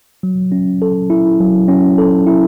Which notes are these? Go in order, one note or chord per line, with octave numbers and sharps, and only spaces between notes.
F#3
C#4
A4
E4
F#3
C#4
A4
E4